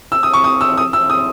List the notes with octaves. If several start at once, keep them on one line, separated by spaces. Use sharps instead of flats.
E6
D#6
C#6
D#6
E6
D#6
E6
D#6